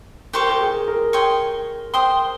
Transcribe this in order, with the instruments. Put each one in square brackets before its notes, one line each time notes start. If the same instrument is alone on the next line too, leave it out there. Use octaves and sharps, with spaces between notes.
[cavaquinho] G4 C5 G5 C#6 [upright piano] A#4
[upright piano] A#4
G#4
A#4
[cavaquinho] C#5 G5 C6 D#6
C5 G5 C6 D#6